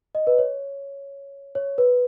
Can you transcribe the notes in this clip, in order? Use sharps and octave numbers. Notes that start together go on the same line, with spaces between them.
D#5
B4
C#5
C#5
B4